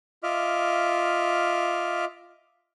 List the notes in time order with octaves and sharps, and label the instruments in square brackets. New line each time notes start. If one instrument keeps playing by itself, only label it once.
[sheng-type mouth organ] F4 D#5 E5 D6 F6